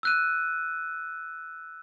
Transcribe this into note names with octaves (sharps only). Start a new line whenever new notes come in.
E6 F#6 D#7